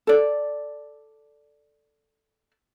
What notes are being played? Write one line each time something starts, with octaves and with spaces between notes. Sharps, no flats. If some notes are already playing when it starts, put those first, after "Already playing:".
A4 D5